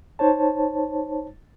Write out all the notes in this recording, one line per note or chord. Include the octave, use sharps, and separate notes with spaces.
D#4 C5 C#5 A5